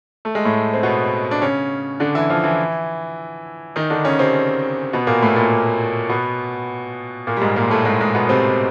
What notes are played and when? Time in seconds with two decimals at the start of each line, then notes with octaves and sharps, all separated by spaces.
0.25 A3
0.35 G#3
0.45 A2 A3
0.73 C4
0.83 B2 B3
1.31 D4
1.42 C#3 C#4
2.00 D3 D4
2.15 E3 E4
2.30 F3 F4
2.44 E3 E4
3.76 D#3 D#4
3.90 D3 D4
4.05 C#3 C#4
4.19 C3 C4
4.93 B2 B3
5.07 A#2 A#3
5.22 A2 A3
5.36 A#2 A#3
6.09 B2 B3
7.27 A#2 A#3
7.37 G3
7.42 G#2 G#3
7.56 A#2 A#3
7.70 A2 A3
7.85 G#2 G#3
8.01 G#2 G#3
8.15 B2 B3
8.29 C3 C4